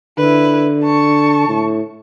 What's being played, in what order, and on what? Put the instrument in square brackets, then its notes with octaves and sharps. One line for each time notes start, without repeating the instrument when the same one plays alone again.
[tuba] D3 [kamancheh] E4 B4
[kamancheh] A5 C#6
[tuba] A2